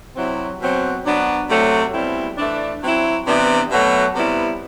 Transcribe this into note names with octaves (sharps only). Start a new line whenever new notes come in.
C3 F#3 C4 E4
B2 F#3 C4
F#3 B3 D4
C3 F#3 A3
B2 G3 C4 E4
E3 A3 D4
F#3 C4 E4
C3 E3 B3 D4
B2 F#3 A3
C3 G3 B3 E4